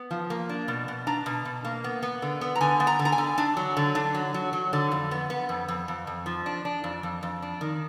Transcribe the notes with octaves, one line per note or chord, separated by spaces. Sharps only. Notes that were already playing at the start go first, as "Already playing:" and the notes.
Already playing: B3
F3
A#3
D4
B2
B2
D4 A#5
B2
B2
A#3
B3
B3
D3
B3
A#5
D3 G#5
B3
A#5
D3
A#5
G#5
D3
D4
F#3
D3
D4
F#3
F#3
F#3
D3
F2
B3
B3
F2
F2
F2
F2
F3
D4
D4
F2
F2
F2
D4
D#3